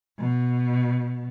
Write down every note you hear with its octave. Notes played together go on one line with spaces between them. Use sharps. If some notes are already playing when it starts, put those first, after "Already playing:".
B2